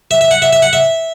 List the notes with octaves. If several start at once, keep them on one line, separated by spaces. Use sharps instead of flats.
E5
E5
F#5
E5
E5
F#5
E5